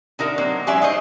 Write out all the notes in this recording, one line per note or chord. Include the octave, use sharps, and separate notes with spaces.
D3 D#4 A#4 E5
F#3 A#3 C4
F#3 G#3 C#4 G#4 D5 E5
D#4 G#4 C5 C#5 D#5